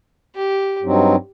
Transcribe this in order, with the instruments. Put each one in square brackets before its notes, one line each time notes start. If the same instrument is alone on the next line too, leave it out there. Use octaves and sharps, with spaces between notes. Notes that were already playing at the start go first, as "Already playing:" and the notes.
[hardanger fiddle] G4
[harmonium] G2 F#3 C4 D#4